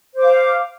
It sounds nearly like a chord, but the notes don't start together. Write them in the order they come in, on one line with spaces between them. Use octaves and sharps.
C5 D6 F5